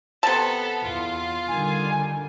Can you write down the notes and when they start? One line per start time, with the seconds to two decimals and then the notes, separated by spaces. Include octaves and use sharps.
0.23 C3 B3 A4 A5
0.84 E2 F4
1.48 D3 D#3 G3 G#5